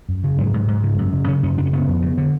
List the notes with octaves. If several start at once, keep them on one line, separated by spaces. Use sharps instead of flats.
F#2
C#3
G#2 F#3
G#2
G#2
C#3
F#2
C#3
C#3 C#4
F#2 C#4
C#3 D4
C#4
C#3 B3
F2
C#3
D3